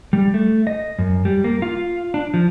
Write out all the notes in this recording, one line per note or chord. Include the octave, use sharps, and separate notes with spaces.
G3
A3
D#5
F#2
G3
A#3
F4
D4
F3